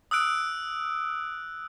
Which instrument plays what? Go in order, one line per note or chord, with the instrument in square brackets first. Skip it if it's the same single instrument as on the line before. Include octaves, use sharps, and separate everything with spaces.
[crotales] D#6 E6 F#6 D7